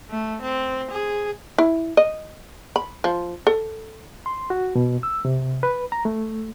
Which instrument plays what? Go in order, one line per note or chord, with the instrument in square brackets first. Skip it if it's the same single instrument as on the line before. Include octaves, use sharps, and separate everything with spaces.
[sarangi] A3
C4
G#4
[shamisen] E4
D#5
B5
F3
A4
[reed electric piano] C6
F#4
B2
E6
C3
B4
A#5
A3